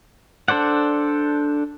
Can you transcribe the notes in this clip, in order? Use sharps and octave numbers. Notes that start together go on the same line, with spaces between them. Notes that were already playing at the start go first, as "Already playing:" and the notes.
D4 A4 C5 D5 F#5